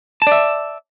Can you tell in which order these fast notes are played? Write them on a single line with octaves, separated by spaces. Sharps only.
A5 D5 E5